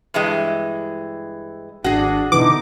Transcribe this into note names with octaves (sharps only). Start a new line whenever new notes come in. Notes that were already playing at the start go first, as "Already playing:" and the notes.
G2 E3 G#3
G#1 D4 F#4 G#4
B2 D3 E3 D#4 D6